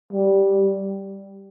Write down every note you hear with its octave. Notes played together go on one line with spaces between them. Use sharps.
G3